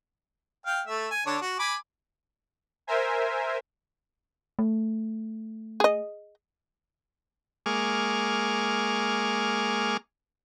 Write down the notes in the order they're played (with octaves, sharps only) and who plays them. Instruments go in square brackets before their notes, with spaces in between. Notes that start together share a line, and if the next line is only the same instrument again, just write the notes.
[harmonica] F5 G5
A3 E5
G#5
D3 D4 C#5
F#4
G#5 B5 D6
[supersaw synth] A#4 C5 E5 G#5
[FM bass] A3
[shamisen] G#4 D#5
[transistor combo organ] G#3 A#3 G#4 C#6 D6 F6